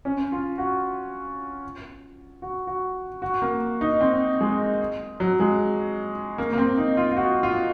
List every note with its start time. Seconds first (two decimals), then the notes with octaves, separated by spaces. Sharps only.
0.05 C#4
0.32 F4
0.58 F#4
2.42 F#4
2.67 F#4
3.22 F#4
3.42 A#3
3.81 D#4
4.01 C4
4.41 G#3
5.20 F#3
5.40 G#3
6.38 A#3
6.53 A#3
6.58 C4
6.78 D#4
6.97 F4
7.11 F4
7.17 F#4
7.43 F4